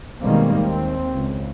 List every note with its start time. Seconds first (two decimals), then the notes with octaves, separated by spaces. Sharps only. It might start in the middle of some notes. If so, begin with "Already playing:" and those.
0.21 B2 D#3 G3 G#3 A#3 C4
0.59 D#2 C4
1.14 C#2